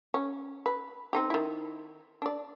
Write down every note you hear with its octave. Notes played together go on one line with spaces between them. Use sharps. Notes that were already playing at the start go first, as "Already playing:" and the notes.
C#4
B4
C4 D#4 G4
D#3 E4
D4 D5